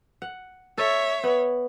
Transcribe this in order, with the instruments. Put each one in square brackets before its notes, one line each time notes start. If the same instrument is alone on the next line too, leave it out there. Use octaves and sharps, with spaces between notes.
[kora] F#5
[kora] A4 [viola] C#5 E5
[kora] B3